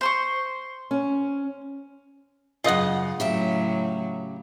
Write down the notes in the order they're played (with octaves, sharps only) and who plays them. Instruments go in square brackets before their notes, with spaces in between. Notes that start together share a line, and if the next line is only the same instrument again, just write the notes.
[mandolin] C5 C6 C#6
[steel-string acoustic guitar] C#4
[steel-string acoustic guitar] F#2 C#3 [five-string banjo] F4 D#5 F#5
[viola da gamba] A2 F#3 [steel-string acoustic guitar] C#3 G4 E5